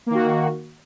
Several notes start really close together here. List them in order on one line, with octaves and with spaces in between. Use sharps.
A#3 D#3 F#4